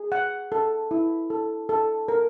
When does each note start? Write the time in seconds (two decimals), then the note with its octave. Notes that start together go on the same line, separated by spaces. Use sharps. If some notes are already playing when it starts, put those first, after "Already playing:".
Already playing: G#4
0.12 F#5
0.52 A4
0.91 E4
1.30 A4
1.69 A4
2.08 A#4